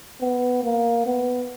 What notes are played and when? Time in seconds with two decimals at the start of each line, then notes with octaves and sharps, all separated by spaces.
0.21 B3
0.63 A#3
1.07 B3